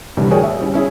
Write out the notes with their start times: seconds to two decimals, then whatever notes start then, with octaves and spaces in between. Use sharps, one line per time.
0.17 C2 A2 D3 E3 G3
0.31 F#4 G#4 A#4 C#5 D5 G5
0.43 E5
0.60 G3 C#4 E4
0.74 C#4 E4 G#4